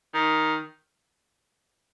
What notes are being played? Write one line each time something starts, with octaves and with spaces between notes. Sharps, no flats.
D#3